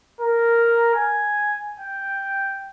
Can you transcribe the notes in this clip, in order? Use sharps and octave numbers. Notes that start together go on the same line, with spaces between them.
A#4
G#5
G5